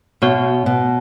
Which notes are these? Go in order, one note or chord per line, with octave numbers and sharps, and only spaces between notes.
B2 B3 F#4 C#5
B2